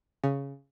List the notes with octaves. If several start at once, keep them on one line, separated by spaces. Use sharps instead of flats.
C#3